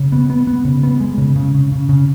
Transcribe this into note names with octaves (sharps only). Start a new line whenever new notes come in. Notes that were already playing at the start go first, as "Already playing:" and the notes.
Already playing: C#3
B3
B3
B3
C#3
B3
G#3
C#3
C#3
C#3
C#3
C#3